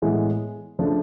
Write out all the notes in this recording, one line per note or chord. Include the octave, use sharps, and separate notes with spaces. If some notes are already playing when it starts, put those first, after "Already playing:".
A2 E3 G#3 B3
C#3 F3 A3 D4